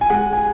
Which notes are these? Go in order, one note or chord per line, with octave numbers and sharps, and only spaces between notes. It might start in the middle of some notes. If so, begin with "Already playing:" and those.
G#5
G#3 F#5
G#5